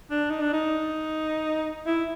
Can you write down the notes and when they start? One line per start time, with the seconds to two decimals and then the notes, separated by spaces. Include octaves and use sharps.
0.11 D4
0.30 D#4
0.42 D4
0.53 D#4
1.87 E4